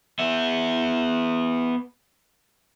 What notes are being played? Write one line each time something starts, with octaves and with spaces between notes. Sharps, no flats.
B3 E5